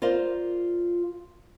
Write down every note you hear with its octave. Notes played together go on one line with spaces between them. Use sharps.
F4 A#4 C5 D5 F5